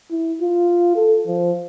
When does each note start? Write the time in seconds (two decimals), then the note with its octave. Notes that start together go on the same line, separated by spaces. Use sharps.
0.11 E4
0.41 F4
0.96 A4
1.27 F3